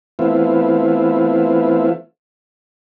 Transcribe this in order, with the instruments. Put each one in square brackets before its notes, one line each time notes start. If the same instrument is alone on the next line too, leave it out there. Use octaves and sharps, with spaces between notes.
[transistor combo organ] E3 A3 B3 C4 E4 F4